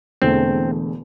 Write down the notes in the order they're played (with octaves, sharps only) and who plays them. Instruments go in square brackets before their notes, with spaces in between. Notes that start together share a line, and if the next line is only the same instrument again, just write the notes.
[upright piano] E1 E2 D3 A3 [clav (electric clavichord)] C4